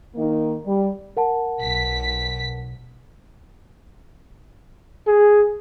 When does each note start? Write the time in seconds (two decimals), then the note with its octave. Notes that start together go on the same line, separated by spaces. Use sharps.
0.15 D#3 A#3 D#4
0.64 G3
1.17 A#4 F#5 A5
1.61 B1 B6
5.07 G#4